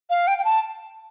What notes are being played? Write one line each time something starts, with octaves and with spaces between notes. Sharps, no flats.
F5
G5
G5
A5